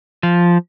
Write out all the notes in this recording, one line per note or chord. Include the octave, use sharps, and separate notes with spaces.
F3